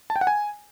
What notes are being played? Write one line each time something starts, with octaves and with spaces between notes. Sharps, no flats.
A5
G5
F#5
G#5